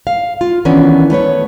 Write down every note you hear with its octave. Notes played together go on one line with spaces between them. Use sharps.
F5
F4
D#3 E3 B3 C#4 D4
A3 B3 B4 C#5